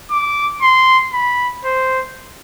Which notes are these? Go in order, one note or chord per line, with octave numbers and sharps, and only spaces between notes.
D6
C6
B5
C5